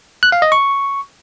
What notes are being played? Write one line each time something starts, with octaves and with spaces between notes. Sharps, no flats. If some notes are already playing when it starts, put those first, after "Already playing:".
F#6
F5
D#5
C#6